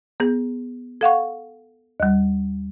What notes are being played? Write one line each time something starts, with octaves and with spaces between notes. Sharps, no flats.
B3 G#4
A4 F5 F#5 C#6
D#2 G3